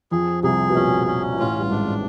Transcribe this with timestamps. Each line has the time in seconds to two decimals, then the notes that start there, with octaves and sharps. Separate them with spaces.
0.11 F2 F3 G#4
0.43 C2 C3 G#4
0.70 B2
0.75 A#1 A#2 C#4
1.07 C#4
1.34 A#2
1.39 A1 A2 F4
1.59 G2
1.70 G#1 G#2 D4